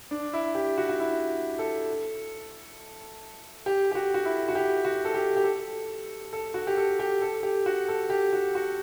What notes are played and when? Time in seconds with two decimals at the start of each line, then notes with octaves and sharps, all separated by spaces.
0.11 D4
0.33 E4
0.55 G4
0.78 F#4
0.89 F#4
1.00 E4
1.59 A4
3.66 G4
3.92 G4
3.95 F#4
4.14 F#4
4.25 E4
4.48 F#4
4.55 G4
4.85 F#4
5.05 A4
5.14 G4
5.36 G4
5.44 A4
6.33 A4
6.54 F#4
6.67 G4
6.77 A4
6.99 G4
7.22 A4
7.43 G4
7.66 F#4
7.88 A4
8.10 G4
8.33 F#4
8.55 F#4